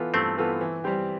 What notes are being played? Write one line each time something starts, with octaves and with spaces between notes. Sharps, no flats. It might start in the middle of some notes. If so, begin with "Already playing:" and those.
Already playing: E3 B3 F4 A4
G2 A3 C4
E3 B3 F4 A4
E3
G3 C4 G4